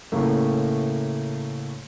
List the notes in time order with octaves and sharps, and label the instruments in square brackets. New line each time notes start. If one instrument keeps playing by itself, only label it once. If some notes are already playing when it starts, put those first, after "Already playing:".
[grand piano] A2 C#3 A3 A#3